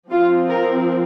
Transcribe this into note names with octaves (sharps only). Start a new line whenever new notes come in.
F3 C4 F4
A#4